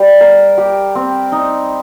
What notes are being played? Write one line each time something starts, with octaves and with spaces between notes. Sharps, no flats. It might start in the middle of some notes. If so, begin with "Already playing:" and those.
Already playing: G3
A#4
G4
C4
D#4